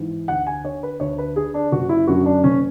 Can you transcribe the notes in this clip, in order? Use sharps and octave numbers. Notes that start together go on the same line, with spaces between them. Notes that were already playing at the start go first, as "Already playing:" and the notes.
Already playing: G#2 E3
D2 F#5
G#5
D3 C#5
B4
D2 C#5
B4
D3 G#4
D4
F#1 F#4
E4
F#2 D3 F#4
D4
F#1 C#4